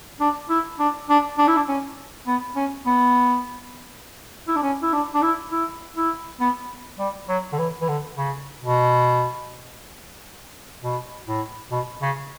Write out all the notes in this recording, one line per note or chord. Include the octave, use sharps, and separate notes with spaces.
D4
E4
D4
D4
D4
E4
D4
C#4
B3
C#4
B3
E4
D4
C#4
E4
D4
D4
E4
E4
E4
B3
G3
F#3
D3
E3
E3
D3
C#3
B2
B2
A2
B2
C#3